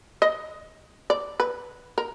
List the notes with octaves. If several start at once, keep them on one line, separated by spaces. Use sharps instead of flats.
D#5
D5
B4
A#4